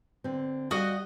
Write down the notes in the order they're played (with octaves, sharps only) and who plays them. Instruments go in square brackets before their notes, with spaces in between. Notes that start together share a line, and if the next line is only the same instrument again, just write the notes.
[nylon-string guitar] D3 C4
[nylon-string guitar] G3 F5 [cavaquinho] F#4 D#5 F#5